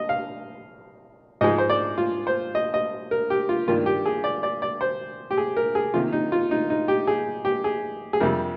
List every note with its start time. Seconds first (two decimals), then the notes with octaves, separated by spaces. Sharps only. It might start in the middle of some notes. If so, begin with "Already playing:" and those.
Already playing: D#5
0.09 F5
1.41 G#2 F3 G#3 D#5
1.58 C5
1.70 D5
1.98 F4
2.27 C5
2.55 D#5
2.74 D#5
3.11 A#4
3.30 G4
3.49 F4
3.68 G2 D#3 A#3 F4
3.86 G4
4.06 G#4
4.24 D5
4.43 D5
4.62 D5
4.81 C5
5.31 G4
5.38 G#4
5.57 A#4
5.75 G#4
5.94 C3 D#3 A#3 F4
6.12 D#4
6.32 F4
6.51 D#4
6.70 D#4
6.88 G4
7.07 G#4
7.45 G4
7.64 G#4
8.13 G#4
8.20 F2 C3 G3 A#4